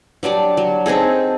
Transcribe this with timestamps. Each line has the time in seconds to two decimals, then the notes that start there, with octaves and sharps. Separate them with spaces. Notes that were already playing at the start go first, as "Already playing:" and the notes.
0.23 F#3 G3 D4 D5
0.57 F#3
0.86 C4 D#4 G#4 A4